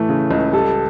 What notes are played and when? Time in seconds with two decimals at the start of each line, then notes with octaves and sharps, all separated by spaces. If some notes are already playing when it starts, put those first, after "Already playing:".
Already playing: A2 E3 A3
0.09 C#3
0.31 C#2
0.53 G3 A4